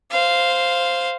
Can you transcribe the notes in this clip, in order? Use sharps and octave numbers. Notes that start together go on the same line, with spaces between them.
C5 F5